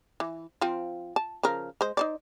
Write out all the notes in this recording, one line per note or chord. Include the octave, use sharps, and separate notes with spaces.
E3
F3 C4 F4
A5
C#3 F3 A#4
G#3 C5
D#4 C5 D5